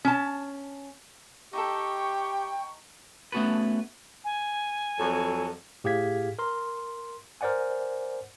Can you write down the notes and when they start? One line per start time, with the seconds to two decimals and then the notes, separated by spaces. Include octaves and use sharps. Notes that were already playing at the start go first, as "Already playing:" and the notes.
0.05 C#4 A5
1.53 D#4 E4 G4 A4 G5 C#6
3.32 A3 B3 C#4 F#4 A4 B4
4.25 G#5
4.98 F2 F#3 A4
5.84 A2 G4 G#4 F5 G#6 B6
6.39 A#4 C6
7.41 A#4 C5 D5 F#5 G#5